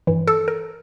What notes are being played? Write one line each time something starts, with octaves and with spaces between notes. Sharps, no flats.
G2 E3
A4
A#4